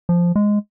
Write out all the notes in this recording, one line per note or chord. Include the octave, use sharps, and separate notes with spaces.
F3
G#3